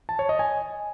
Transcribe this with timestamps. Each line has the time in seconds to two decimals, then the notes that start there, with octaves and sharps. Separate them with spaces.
0.09 A5
0.19 C#5
0.29 D#5
0.39 G#5